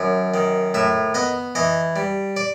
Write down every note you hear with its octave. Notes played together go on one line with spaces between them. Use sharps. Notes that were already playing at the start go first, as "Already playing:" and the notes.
Already playing: F#2 D#3
D#3
A2 E5
B3 D#5
E3 D#5
G3
D5